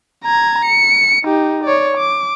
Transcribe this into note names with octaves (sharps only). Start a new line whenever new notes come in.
A#5 G#6
C#7
D#4 G4
C#5 D5
D6